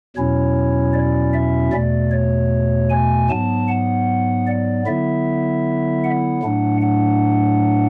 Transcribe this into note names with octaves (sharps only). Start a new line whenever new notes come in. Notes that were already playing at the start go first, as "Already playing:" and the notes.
E2 B2 F#3 C#4 E4 C#5
D5
E5
E2 B2 A3 D5
C#5
G#5
G#2 F#3 B3 A5
F#5
D5
D3 F#3 B3 E4 E5
F#5
A2 F#3 A3 D4
F#5